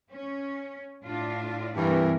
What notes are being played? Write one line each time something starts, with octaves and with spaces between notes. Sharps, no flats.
C#4
A2 D4 F4
G2 C3 E3 G3 A#4